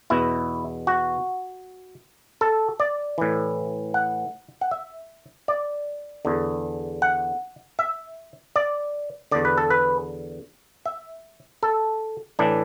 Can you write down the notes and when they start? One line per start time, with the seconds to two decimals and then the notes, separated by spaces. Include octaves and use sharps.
0.10 E2 B2 E4
0.87 F#4
2.41 A4
2.80 D5
3.18 A2 E3
3.94 F#5
4.61 F#5
4.71 E5
5.48 D5
6.25 E2 D3
7.02 F#5
7.79 E5
8.56 D5
9.31 E2 D3 D5
9.45 B4
9.58 A4
9.70 B4
10.86 E5
11.63 A4
12.39 A2 E3 D4